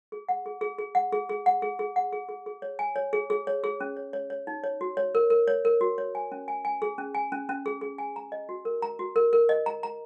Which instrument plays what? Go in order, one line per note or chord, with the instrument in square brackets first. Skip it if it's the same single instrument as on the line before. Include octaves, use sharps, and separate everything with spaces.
[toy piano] G#4
F#5
G#4
G#4
G#4
F#5
G#4
G#4
F#5
G#4
G#4
F#5
G#4
G#4
G#4
C#5
G#5
C#5
G#4
G#4
C#5
G#4
C#4
C#5
C#5
C#5
D#4
C#5
F#4
C#5
A#4
A#4
C#5
A#4
F#4
C#5
G#5
C#4
G#5
G#5
G#4
C#4
G#5
C#4
C#4
G#4
G#4
G#5
A#5
D#5
F#4
A#4
A#5
F#4
A#4
A#4
D#5
A#5
A#5